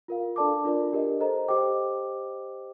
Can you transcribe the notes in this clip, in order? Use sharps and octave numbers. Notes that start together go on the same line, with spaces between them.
F4 A#4 F5
D4 A4 D5 A5 D6
D4 F4 A#4 D5
D4 G4 A#4 D#5
A4 C5 D#5 A#5
G4 C5 D#5 G5 D6